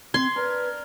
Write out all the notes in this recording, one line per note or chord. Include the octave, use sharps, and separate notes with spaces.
C4 C6 G#6
D4 A#4 B4